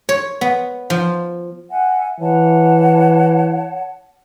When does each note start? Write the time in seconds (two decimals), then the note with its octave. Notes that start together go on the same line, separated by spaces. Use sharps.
0.09 C#5
0.41 B3
0.90 F3
1.70 E5 F#5 G#5
2.20 E3 C#5 F#5 A5